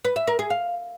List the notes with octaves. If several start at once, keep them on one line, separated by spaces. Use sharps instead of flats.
B4
E5
A#4
G#4
F5